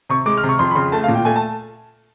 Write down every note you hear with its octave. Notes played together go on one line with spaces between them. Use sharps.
C3 C#6
G#3 D6
F6
C3
C#6
F2 C6
B5
C#3 C6
A3 A5
F5
A#2
G5
A3 G#5
A5